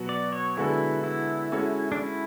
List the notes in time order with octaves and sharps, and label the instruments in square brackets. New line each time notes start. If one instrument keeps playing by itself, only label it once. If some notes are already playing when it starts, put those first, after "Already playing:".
Already playing: [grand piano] B2 F#3 B3 F#4
[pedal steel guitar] D5
C#5
[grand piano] D3 G#3 B3 F#4 A4 [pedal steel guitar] E4
[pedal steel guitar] E4
[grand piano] G#3 C#4 F#4 A4
[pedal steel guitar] D4
E4